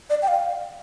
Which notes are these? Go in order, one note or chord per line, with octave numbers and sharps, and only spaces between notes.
D5
G5
F5